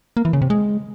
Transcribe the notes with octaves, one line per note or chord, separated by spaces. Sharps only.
A#3
E3
C#3
C3
G#3